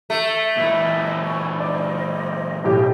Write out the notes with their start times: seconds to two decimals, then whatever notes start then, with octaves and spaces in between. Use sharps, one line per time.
0.10 A3
0.57 A#2 E3 D#5
1.24 G#5 C#6
1.60 C5 D5 D#5
2.64 B1 A2 G4 D#5